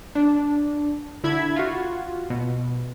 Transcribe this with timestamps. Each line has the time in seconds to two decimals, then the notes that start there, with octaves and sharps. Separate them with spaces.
0.15 D4
1.23 D3 E4 B5 G#6
1.56 F4 F#4
2.30 B2